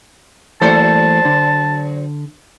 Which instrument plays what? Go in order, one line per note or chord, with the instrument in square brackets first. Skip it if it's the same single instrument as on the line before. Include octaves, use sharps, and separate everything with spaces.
[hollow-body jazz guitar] E3 A3 A#3 [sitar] F#3 A4 C5 [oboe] A5
[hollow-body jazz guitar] D3